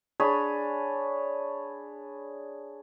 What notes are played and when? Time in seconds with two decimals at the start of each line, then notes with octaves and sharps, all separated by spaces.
0.20 D4 G#4 C#5 B5